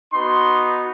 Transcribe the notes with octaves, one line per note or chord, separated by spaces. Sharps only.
B3 D#4 F#4 C6